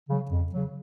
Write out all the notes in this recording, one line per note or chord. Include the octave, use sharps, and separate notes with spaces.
C#3 F#3
F2
C#3 F#3